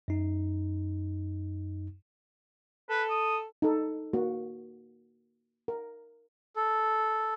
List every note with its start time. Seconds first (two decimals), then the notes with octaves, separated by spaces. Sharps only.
0.08 F#2 D#4
2.90 A4 B4
3.10 D#6
3.62 D#4 A4
4.13 A#3 F#4
5.68 A#4
6.56 A4